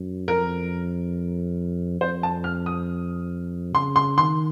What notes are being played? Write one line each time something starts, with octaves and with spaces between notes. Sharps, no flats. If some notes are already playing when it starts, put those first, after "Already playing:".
Already playing: F#2
F2 A#4
F2 C5
A5
F6
D#6
C#3 C6
C6
D#3 C6